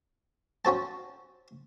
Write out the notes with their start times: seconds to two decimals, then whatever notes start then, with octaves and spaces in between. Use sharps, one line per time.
0.65 C#4 F#4 C5 A5